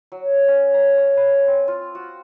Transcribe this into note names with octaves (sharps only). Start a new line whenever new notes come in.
F#3
C#4
A#5
C#5
B4
C4
F4
F#4